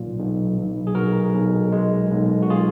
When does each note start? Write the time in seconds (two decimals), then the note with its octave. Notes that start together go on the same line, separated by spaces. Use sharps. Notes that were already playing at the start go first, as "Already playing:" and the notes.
Already playing: B1 A#2
0.18 B1
0.57 B1
0.87 G#4
0.95 B1 F#4 A#4
1.34 B1
1.72 G#3
2.12 B1
2.42 F#4
2.50 F4 G#4